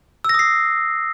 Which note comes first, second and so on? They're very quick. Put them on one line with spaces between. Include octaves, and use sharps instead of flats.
E6 A#6 D#6 C7